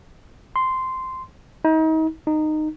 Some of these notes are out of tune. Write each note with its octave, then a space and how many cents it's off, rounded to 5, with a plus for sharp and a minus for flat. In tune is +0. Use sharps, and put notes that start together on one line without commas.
C6 -10
D#4 +35
D#4 -15